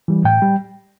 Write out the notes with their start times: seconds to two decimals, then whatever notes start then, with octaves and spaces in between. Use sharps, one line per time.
0.08 E3 G3
0.24 A2 G5
0.42 G3